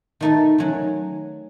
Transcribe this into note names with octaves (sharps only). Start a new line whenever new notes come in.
D#3 A3 D#4 A4
D#3 F#3 C#4